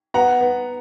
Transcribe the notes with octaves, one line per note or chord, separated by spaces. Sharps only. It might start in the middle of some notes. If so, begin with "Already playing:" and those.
B3 F#5 A#5
B3